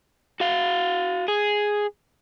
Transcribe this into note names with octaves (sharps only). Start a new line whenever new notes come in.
F#4 F5
G#4